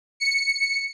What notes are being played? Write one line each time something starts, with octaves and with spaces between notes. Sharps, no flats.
C#7